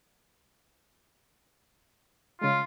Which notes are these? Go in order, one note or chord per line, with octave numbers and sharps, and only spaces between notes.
C#3 G#3 F4